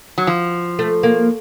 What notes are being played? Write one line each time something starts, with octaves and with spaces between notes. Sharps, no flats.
F#3
F3
A3
A#3